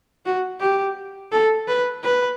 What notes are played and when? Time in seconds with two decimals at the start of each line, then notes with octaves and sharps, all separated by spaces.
0.26 F#4
0.60 G4
1.32 A4
1.68 B4
2.03 B4